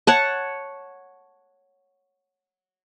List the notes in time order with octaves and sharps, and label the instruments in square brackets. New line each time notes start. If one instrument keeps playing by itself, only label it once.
[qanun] C#5 F#5 A5